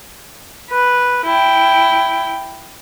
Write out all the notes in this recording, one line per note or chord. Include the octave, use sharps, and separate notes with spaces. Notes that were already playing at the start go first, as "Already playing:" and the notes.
B4
E4 G5